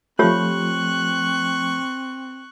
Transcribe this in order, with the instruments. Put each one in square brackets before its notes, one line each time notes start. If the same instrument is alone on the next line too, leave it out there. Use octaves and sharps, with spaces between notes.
[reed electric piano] F3 A3 [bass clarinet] C4 [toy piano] F4 G4 C#5 [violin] C#6 F#6